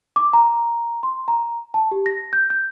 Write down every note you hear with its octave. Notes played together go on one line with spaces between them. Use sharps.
D6
A#5
C6
A#5
A5
G4
A#6
G6
G6